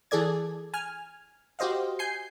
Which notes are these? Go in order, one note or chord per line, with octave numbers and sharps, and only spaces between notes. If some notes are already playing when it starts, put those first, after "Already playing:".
E3 G#4 A4 D5 G#6
G#5 F6
F#4 G4 C5 D#5 F5
G#5 G6 C7